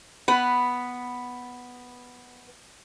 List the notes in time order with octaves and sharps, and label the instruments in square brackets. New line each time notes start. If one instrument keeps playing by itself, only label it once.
[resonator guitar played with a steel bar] B3 B4